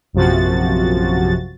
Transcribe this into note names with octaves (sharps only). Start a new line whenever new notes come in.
A#1 F#2 C3 F3 F#4 A6